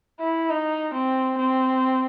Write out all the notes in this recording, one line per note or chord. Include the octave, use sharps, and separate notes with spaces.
E4
D#4
C4
C4